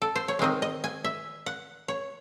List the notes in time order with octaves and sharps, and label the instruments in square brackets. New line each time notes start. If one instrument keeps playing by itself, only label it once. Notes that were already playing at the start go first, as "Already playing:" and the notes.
[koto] A4
C5
C#5
D#3 G#3 C4 D#5
D#5
G#5
E5
F#5
C#5